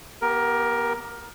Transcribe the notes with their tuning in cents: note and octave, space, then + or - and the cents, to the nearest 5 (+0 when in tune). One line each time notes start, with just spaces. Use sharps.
B3 -25 G4 -5 A#4 +15